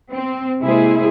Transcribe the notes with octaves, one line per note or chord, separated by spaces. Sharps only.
C4
C3 G#3 A#3 E4 G#4 C5